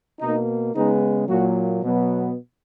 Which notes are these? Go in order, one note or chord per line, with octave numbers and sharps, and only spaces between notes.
B2 A#3 D#4
C#3 G#3 B3 D#4
A#2 F#3 A#3 F#4
B2 F#3 B3